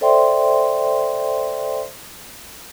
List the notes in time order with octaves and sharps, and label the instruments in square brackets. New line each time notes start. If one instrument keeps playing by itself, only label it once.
[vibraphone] A4 C5 D5 E5 G5 C6